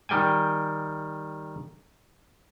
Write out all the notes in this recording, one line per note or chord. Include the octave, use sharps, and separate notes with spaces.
D#3 G3 G5 G#5